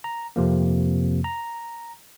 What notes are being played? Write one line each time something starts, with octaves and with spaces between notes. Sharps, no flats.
A#5
F2 C3 F3 A#3
A#5